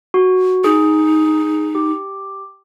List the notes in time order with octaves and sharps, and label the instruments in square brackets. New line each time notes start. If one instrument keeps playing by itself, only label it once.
[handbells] F#4
[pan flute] D#4 [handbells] G#4
[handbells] G4